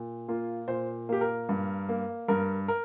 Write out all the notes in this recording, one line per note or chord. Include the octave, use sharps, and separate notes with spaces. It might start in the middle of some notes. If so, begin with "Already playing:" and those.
Already playing: A#2
A#3 F4
A#2 C5
A#3 G4
A#4
G2
A#3
G2 A#4
A#4